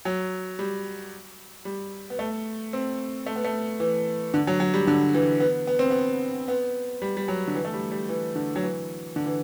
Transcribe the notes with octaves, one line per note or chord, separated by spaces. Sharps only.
F#3
G3
G3
B3
A3
C4
A3
B3
A3
E3
D3
F#3
F#3
G3
D3
E3
B3
B3
C4
B3
B3
G3
G3
F#3
D3
E3
A3
G3
G3
E3
D3
F#3
E3
D3
E3